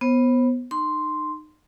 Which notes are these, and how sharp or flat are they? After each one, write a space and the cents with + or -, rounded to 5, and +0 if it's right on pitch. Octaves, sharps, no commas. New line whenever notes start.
B3 +0 C5 +30
D#4 -30 C6 +0